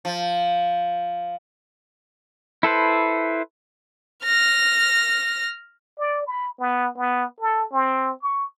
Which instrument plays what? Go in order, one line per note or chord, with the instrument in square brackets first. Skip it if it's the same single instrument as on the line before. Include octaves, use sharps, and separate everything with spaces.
[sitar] F3
[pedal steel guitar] E4 A4 B4 C5
[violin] F6 A#6
[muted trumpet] D5
B5
B3
B3
A4
C4
C#6